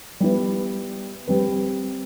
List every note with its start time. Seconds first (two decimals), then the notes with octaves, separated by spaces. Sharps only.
0.20 G3 B3 E4 B4
1.28 G3 C4 G4 B4